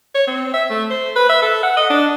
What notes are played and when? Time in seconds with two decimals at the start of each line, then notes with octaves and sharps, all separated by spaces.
0.15 C#5
0.27 C4
0.54 E5
0.70 A3
0.90 C5
1.16 B4
1.29 E5
1.42 A4
1.63 F#5
1.77 D#5
1.90 D4